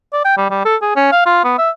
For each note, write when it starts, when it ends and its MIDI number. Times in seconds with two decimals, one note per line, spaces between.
0.13 0.22 74
0.25 0.36 79
0.37 0.49 55
0.50 0.60 55
0.65 0.76 69
0.82 0.91 68
0.96 1.10 61
1.12 1.25 77
1.26 1.44 65
1.44 1.55 59
1.58 1.70 76